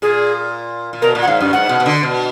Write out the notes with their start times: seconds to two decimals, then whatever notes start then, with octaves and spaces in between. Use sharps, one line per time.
0.02 A#2 G#4
0.93 A#2
1.02 B2 A#4
1.15 A#2
1.22 F#5
1.27 G#2 F5
1.40 F#2
1.53 G#2 F#5
1.69 B2
1.80 B2
1.86 D3
2.03 B2